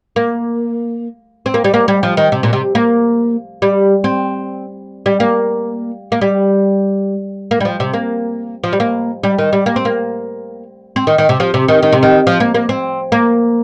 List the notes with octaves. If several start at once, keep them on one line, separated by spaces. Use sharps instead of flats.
A#3
C4
A#3
G3
A#3
G3
F3
D#3
C3
A#2
C3
A#3
G3
C4
G3
A#3
A#3
G3
A#3
G3
F3
C3
A#3
F3
G3
A#3
G3
D#3
G3
A#3
C4
A#3
C4
D#3
D#3
C3
F3
C3
D#3
D#3
C3
D#3
F3
A#3
A#3
C4
A#3